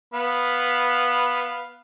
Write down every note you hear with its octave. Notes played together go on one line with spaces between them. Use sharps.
B3 F5 B5